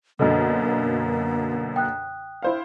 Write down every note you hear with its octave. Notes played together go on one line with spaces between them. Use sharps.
F#2 B2 D3 A#3 A4 D#5
G5 D#6 F#6
E4 C5 F5